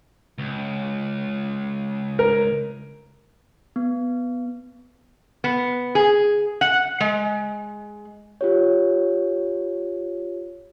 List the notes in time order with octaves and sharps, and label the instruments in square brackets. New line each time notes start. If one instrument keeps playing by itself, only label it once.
[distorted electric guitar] C#2
[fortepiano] A#4
[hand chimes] B3
[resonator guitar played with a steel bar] B3
G#4
F#5
G#3
[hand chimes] F4 G4 C#5